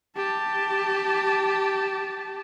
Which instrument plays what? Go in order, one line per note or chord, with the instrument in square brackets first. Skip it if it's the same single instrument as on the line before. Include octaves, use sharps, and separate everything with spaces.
[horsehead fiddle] G4 A5